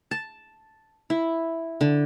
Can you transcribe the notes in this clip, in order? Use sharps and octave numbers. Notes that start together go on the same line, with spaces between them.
A5
E4
D3